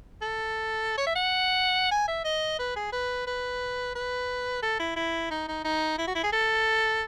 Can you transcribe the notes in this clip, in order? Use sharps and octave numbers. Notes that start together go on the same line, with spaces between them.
A4
C#5
E5
F#5
G#5
E5
D#5
B4
G#4
B4
B4
B4
A4
E4
E4
D#4
D#4
D#4
E4
F#4
E4
G#4
A4